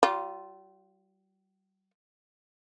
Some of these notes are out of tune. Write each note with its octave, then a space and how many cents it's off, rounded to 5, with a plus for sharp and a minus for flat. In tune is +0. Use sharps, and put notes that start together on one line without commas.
G3 -40 F4 +0